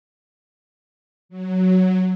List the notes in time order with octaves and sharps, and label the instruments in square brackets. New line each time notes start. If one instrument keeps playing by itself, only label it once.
[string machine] F#3